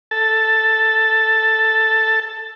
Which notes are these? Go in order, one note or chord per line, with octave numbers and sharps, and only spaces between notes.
A4 A5